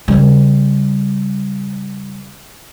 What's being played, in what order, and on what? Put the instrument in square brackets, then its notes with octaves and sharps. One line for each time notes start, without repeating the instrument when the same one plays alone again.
[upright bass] C#3 G3